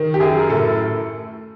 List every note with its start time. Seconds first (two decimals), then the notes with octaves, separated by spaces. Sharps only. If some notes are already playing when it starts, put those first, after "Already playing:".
Already playing: D#3
0.14 G4
0.20 F#2 G#4
0.39 A#4
0.50 A2 A4